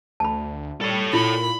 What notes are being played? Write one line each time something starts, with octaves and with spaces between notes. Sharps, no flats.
D2 A5 B5
G3 A4 C#5
A#2 E4 F4 B5